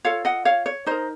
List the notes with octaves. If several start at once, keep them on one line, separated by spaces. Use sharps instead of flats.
F4 A4 C#5 F5
D#5 F#5
C#5 F5
C#5
D#4 A#4 C5 D#5